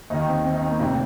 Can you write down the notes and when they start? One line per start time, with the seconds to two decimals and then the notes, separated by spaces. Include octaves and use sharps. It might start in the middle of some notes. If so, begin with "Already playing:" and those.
0.10 D#2 D#3 D#4
0.28 C4
0.45 C4
0.54 D#4
0.62 C4
0.71 A#3
0.80 F1 F2 C3 C4